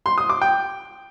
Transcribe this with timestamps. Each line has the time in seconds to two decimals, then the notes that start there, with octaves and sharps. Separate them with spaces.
0.06 C6
0.18 D#6
0.30 D6
0.42 G5